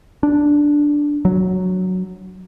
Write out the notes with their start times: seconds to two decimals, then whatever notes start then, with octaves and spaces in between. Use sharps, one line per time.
0.23 D4
1.25 F#3